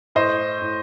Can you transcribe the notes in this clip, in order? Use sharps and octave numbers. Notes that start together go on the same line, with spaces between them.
A2 C5 D#5
A2